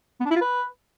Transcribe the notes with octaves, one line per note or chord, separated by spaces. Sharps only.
B3
D4
E4
F4
B4